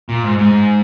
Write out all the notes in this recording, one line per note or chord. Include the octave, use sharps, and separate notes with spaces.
A#2
G#2
G#2